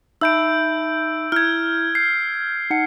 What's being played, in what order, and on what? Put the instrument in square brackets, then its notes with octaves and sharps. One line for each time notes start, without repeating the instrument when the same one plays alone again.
[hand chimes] D#4 E5 B5 [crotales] E6 G6 D7
[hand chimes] E4 [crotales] F6 G#6
[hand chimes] G6 [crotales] C7
[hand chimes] D#4 F#5 C#7